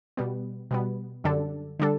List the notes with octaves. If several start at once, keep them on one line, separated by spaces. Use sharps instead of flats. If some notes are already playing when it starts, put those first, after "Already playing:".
B2 G3 B3
B2 G3 B3
F#2 D3 G3 D4 A4
D3 G3 D4 A4